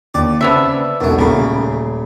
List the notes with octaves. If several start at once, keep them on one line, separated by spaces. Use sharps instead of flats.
D#2 D5
C#3 B3 C4 D4 E5 F7
E1 B1 F#2 F#3 A4
D#1 A2 C#3 A#4 B5